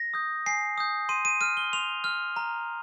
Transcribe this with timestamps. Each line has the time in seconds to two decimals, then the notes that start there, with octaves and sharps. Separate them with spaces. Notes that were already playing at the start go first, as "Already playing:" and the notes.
Already playing: A#6
0.14 D#6 G6
0.46 G#5 C7
0.78 D#6 G6
1.09 C6 D#7
1.25 D#7
1.41 F6 D#7
1.57 G7
1.73 C6 F7
2.04 F6
2.36 A#5